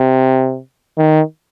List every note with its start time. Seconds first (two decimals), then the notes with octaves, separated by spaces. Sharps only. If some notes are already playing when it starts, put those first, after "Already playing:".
Already playing: C3
0.98 D#3